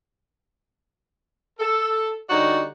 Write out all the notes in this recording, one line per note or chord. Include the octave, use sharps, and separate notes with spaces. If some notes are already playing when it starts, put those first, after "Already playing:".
A4
D3 G3 D#4 F#4 C#5 D5